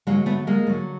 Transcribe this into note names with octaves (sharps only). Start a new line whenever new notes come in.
D3 F#3 G#3 A#3
A3 B3
G#3 A#3
D3 F#3